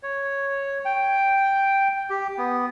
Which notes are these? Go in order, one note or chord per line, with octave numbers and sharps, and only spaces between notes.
C#5
G5
G4
B3